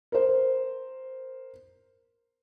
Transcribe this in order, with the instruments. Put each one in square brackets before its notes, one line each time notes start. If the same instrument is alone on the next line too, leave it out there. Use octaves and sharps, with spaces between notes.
[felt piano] A#4 C5